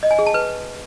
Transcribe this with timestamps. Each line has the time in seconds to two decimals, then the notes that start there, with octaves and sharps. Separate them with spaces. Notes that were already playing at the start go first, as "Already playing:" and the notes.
0.03 D#5
0.11 G#5
0.19 G#4
0.26 A5
0.34 B4